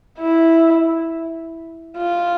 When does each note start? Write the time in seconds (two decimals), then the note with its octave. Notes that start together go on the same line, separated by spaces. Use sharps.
0.20 E4
1.97 F4